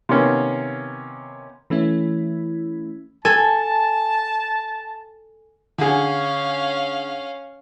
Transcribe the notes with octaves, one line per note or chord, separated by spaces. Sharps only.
C3 D#3 A#3 B3 C#4
E3 A3 C#4 E4
A4 G#5 A5
D3 C#4 G#4 F5